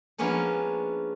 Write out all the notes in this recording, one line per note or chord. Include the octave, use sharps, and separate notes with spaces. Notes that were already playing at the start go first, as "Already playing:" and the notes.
F3 G#3 A#3 B3 C#4 D4